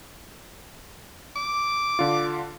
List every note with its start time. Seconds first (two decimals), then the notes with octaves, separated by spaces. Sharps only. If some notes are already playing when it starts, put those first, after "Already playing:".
1.36 D6
1.99 D3 F4